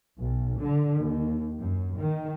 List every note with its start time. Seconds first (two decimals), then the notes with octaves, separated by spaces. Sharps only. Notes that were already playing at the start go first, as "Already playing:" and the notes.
0.19 B1
0.60 D3
1.02 D#2
1.60 F#2
1.99 D#3